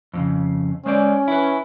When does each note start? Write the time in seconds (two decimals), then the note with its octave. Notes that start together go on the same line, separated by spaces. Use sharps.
0.14 F2 A2 C#3
0.86 G#3 C#4 C5 D5
1.28 E4 B4